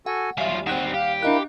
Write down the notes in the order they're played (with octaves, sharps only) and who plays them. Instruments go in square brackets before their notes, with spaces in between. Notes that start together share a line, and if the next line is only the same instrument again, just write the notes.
[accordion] F#4 A4 G#5 [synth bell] F#5
[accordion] D#2 G3 [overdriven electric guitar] F#3 F4 [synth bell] E5 G#5
[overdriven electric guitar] D#3 C4 [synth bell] F#5 F#6
[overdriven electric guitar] G4 [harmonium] F5
[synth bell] D4 D#5 F#6 [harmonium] E4 A#4 F5